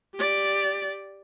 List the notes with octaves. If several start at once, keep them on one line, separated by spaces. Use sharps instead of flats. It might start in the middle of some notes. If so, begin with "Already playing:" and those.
G4 D5